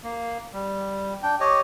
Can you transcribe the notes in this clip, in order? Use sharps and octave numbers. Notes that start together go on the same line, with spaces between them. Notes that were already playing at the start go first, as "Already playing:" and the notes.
A#3
G3
D4 G5
G4 C#5 D#5